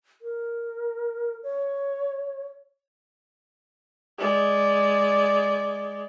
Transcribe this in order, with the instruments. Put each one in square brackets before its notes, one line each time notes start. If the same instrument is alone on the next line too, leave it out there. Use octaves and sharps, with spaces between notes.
[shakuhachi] A#4
C#5
[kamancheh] G#3 D5